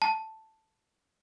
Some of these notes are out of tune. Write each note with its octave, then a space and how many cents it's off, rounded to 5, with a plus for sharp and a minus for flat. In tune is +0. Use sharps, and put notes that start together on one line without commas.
A5 +0